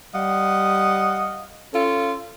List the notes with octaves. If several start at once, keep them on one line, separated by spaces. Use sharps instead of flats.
G3 D#5 F5 F#5
C#4 F4 A4